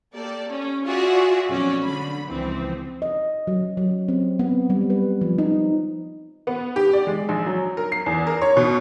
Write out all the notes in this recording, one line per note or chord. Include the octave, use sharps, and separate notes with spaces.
A#3 G4 A4 D5
C#4
F4 F#4 G#4 D5 E5 F#5
B1 F2 C#4 F#4 D5
D3 B5
C#2 E3 F3 C4
D#5
F#3
F#3
C4
B3
G3
B4
F3
D#4
B3
G4
D5
G#3
A#1
F#3
A#4
C7
E2
A#4
C#5
B2